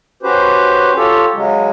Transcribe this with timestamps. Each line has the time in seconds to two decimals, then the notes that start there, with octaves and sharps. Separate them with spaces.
0.23 C#4 F#4 G4 B4 C5
0.96 F4 G4 A4 C#5
1.34 C#3 F#3 G#3